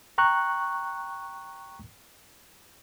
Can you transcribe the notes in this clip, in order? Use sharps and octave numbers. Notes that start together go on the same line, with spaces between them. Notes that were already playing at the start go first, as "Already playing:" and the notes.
G5 A#5 C#6 F#6